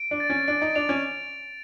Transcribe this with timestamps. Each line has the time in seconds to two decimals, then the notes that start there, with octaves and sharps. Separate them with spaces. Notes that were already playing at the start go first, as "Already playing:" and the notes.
Already playing: D7
0.11 D4
0.20 A6
0.30 C#4
0.48 D4 D7
0.62 D#4
0.75 D4 F7
0.89 C#4